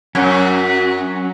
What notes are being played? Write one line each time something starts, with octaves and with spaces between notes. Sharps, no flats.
F#2 F#3 C#4